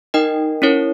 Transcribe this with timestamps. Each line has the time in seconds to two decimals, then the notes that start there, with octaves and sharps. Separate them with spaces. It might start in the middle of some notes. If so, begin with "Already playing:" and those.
0.14 D#4 A#4 D#5 G5
0.62 C#4 E4 A#4 C#5